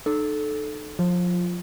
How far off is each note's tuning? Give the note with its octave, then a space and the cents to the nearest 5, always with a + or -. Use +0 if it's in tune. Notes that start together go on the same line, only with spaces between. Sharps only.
D#4 -40 A4 -15
F3 +30 F4 -15